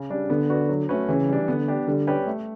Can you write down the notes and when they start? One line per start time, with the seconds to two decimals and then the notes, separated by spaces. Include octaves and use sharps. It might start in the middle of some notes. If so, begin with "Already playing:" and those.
Already playing: C#3
0.10 G3 D4
0.30 D3 B3
0.50 F#4 B4 D5
0.69 F#3
0.89 A3 C#4 F#4 B4
1.09 C#3 E3
1.28 G3 D4
1.48 D3 B3
1.68 D4 G4
1.87 D3 G3
2.07 C#4 G4 B4 D5
2.26 A3